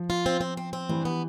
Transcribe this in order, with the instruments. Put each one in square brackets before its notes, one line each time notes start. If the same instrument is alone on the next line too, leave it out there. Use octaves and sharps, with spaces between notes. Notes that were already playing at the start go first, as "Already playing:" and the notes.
Already playing: [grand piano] F3
[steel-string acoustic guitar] F4
C4
C4
C4
C4
[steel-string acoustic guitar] G2 [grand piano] E3
[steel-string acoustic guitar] B3